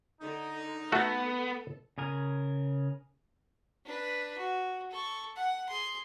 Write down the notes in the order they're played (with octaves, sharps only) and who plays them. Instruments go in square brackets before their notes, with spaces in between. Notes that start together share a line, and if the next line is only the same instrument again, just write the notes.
[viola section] D3 [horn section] D#4
[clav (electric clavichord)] A3 F#4 [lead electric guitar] B3 [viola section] A4
[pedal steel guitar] C#3 G#4 A#4
[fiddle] D4 B4
F#4
A4 C#6
F#5
G#4 C6